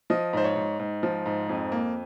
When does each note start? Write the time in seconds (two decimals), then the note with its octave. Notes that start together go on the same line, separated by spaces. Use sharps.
0.10 F3 D#5
0.33 G#2 C5
0.44 C#5
0.56 G#2
0.79 G#2
1.03 F3
1.26 G#2
1.49 F2
1.72 A#3